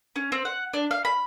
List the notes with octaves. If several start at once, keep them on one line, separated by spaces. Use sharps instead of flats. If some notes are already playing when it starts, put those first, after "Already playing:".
C#4
C4
F#5
D4
F5
B5